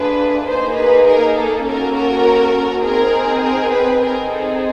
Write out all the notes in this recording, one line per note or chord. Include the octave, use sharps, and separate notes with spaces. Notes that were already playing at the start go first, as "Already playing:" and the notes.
Already playing: A3 D4 F4 G#4 B4
A#3 D#4 G#4 C5
B4
A#4
A4
A#3 C#4 F#4 A4 A#4
A#4
C4 D#4 G#4 A#4
A#4
B4
C4 D#4 G#4 A#4
A4